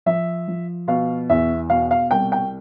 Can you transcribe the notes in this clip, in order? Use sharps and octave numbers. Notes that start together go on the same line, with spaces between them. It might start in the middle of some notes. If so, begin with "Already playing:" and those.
F3 E5
F3
B2 F5
E2 E5
B2 F5
F5
C2 G5
G5